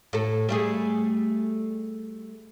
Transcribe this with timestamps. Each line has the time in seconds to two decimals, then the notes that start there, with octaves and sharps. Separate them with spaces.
0.13 A2 A4
0.49 G3 A3 G#4